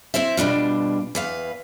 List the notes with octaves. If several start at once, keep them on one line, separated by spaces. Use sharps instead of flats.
C4 E4 C5 E5
B2 G3 D4 F4
E2 B4 F5